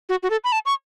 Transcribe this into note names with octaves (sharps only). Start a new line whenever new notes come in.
F#4
F#4
A4
B5
A5
C#6